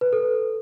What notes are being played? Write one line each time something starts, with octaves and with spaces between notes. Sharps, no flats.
B4
A4